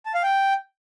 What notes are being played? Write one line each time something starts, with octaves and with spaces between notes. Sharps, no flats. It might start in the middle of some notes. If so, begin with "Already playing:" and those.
A5
F5
G5